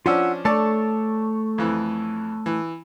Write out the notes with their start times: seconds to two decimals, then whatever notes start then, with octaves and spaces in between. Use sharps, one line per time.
0.06 F3 C#4 D4 F4 F#5 E6
0.45 A3 D4 A4 C#5 D5 A5
1.58 F2 E3
2.46 E3